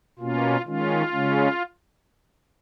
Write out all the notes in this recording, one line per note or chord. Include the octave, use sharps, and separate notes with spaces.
B2 A#3 C#4 F4
D#3 G#3 C#4 F4
C#3 G#3 C#4